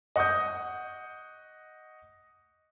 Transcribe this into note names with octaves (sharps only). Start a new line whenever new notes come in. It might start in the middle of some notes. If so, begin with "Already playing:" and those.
D#5 F#5 C#6 D#6 G6